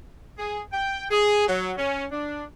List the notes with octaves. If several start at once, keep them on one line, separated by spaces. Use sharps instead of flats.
G#4
G5
G#4
F#3
C#4
D4